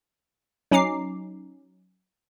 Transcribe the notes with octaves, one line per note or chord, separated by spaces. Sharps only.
F#3 C#4 D#4 A#5 D6 C7